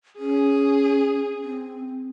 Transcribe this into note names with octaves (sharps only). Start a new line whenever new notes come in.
C#4 G#4
C4